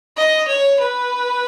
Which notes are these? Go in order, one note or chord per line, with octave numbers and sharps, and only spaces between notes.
D#5
C#5
B4